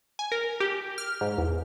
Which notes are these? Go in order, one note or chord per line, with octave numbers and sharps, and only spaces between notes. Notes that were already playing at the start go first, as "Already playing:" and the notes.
G#5
A#4
G4
F6
G#2
E2